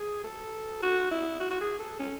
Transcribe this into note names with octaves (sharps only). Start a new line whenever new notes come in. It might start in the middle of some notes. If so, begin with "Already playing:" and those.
Already playing: G#4
A4
F#4
E4
F#4
F#4
G#4
A4
C#4